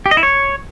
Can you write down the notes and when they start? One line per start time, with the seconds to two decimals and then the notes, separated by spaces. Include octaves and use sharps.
0.06 G4
0.11 D#5
0.17 E4
0.23 C#5